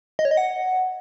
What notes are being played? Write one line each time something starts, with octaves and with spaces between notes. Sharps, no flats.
D#5
C#5
D#5
F#5